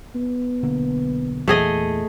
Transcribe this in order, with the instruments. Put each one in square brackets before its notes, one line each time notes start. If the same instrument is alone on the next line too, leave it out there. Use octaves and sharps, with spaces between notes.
[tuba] B3
[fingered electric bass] B1 D3 A#3
[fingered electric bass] E2 A#2 E3 [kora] A3 G#4 D#5